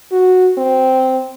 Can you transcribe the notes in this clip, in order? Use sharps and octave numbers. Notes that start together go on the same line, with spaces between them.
F#4
C4